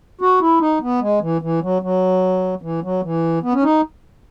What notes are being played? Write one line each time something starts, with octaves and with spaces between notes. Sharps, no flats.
F#4
E4
D#4
B3
G#3
E3
E3
F#3
F#3
E3
F#3
E3
B3
C#4
D#4